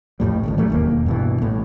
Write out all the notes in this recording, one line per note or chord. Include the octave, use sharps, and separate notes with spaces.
A1 F2 A2 G3
G#1 A2 C#3
E3 F#3 G3 A3
E1 D#2 A#3
G2 B2 E3
A1 A2